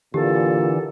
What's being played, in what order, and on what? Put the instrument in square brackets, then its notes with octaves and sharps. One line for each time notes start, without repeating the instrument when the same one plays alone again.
[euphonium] A#2 [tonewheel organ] D3 E3 [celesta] G4 [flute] A4